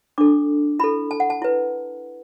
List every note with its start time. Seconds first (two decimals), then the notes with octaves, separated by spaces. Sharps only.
0.18 D4 A4 D6
0.79 E4 A4 B5
1.11 A5
1.20 F#5
1.30 A5
1.42 E4 B4